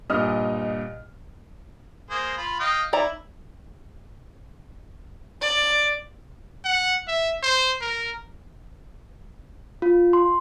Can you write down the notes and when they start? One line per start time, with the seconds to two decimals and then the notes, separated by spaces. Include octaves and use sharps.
0.10 G2 A#2 D#5 F6
2.10 A#3 G#4 C5
2.38 F4 B5
2.60 D#5 F5 G5
2.93 D#4 E4 D5 A#5
5.42 D5
6.65 F#5
7.08 E5
7.43 C5
7.81 A#4
9.82 F4
10.13 C6